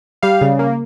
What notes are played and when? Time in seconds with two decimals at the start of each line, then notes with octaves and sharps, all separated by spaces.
0.23 G3 F5
0.41 C#3
0.59 A#3